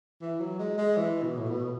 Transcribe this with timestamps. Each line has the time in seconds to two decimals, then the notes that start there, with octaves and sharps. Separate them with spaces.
0.21 E3
0.40 F#3
0.59 G#3
0.78 G#3
0.97 E3
1.23 B2
1.37 A2
1.48 B2